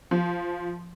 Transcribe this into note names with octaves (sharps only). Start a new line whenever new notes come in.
F3